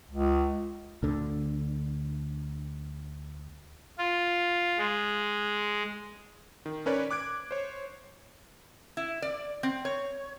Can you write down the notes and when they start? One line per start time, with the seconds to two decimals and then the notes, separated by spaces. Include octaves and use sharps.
0.10 C#2
1.03 D2 D3
3.98 F4
4.78 G#3
6.66 D#3
6.86 C#4 A#4 B4 C#5 D5
7.11 D6 F#6 G#6 D7
7.51 C5 C#5
8.97 E4
9.22 D5
9.63 C4
9.85 C#5